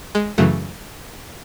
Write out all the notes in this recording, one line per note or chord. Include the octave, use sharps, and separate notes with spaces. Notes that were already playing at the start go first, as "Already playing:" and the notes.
G#3
F#2 C#3 E3 F#3 A3